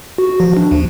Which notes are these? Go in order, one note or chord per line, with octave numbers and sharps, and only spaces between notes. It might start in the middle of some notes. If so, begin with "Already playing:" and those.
F#4
F3
D4
D#2